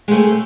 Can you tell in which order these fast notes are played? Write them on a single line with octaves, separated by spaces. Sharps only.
G#3 A3 C4